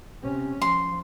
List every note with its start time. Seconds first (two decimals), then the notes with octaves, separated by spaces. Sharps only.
0.23 C3 C#4
0.62 F3 C6